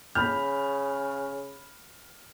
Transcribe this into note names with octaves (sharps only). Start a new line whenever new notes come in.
C#3 B5 F6 G6